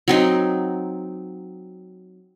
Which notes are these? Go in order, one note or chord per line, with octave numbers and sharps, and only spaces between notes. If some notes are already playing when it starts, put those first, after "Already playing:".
F#3 C4 D#4